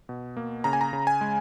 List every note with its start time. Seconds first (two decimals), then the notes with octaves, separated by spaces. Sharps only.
0.09 B2
0.37 A#3
0.64 C#3 A#5
0.73 G#5
0.81 A#5
0.93 C#3
1.07 G#5
1.21 G#3